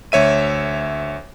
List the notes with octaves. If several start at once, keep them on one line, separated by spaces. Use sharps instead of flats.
D2 C#5 E5 D#7